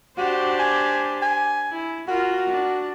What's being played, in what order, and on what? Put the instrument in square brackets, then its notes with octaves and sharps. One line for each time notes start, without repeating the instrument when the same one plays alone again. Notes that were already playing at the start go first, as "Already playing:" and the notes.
[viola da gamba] D4 G4 C5 [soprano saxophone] F#4
[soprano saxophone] G#5
G#5
[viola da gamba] E4
[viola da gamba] F4 A#4 [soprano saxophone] F#4
[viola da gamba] D4